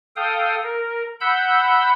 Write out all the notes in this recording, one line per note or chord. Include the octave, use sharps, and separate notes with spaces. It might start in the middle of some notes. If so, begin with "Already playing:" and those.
A4 F5 G5 D#6
A#4
F#5 B5 E6 G6